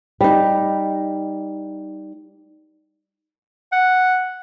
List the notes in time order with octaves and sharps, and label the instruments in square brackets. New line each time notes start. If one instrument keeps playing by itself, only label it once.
[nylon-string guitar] G3 D#4
[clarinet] F#5